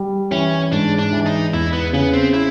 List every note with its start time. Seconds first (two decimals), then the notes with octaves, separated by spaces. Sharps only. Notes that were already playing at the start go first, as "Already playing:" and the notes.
Already playing: G3
0.32 E3 C#4
0.72 G#2 D4
0.99 D4
1.13 E3
1.26 D#4
1.53 E2 E4
1.73 B3
1.93 C#3 B3
2.14 C4
2.34 E4